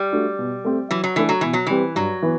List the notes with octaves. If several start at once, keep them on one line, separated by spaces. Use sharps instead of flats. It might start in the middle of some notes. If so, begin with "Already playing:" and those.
Already playing: G3
A3 D4 F#4
B2
A3 C4 G4
E3 F#3
F#3
E3 A3 D4 A4
F#3
B2 E3
F#3
E3 G3 C4 G4 B4
G2 F#3
E3 B3